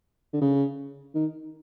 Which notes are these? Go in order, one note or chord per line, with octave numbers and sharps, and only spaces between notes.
D3
C#3
D#3